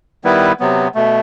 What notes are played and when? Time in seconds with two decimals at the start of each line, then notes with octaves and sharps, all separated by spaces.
0.24 D#3 G3 B3 E4 B4
0.60 C3 F#3 B3
0.95 B2 A3